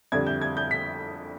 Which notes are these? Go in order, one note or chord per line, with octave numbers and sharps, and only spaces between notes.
F2 D3 G3 G#6
G6
G#6
G6
B6